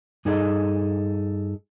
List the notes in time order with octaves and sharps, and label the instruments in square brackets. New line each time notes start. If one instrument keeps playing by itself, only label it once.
[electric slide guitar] G2 D#4 G#4 A4 D#5